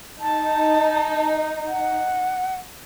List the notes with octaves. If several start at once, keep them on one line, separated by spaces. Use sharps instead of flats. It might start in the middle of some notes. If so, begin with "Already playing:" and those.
D#4 A5
F#5